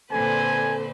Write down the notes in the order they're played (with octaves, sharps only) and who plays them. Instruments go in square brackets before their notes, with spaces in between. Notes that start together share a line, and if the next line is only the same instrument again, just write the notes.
[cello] A#2 D3 [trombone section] C4 A4 [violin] B4 C5 [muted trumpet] G#5